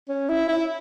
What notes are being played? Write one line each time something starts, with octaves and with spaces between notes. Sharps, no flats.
C#4
E4
E4